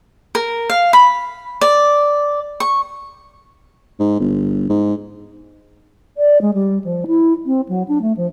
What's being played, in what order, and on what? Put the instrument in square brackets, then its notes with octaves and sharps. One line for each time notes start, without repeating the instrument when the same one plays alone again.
[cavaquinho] A#4
F5
B5
D5
C#6
[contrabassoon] G#2
G1
G#2
[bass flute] D5
G#3
G3
F3
E4
C4
F#3
D4
A3
F3